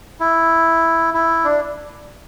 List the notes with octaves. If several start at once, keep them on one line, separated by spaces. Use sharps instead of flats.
E4
E4
D4